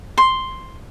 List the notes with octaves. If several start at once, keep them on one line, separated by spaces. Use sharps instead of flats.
C6